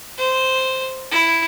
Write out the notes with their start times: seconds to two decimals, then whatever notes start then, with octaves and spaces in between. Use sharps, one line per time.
0.17 C5
1.11 E4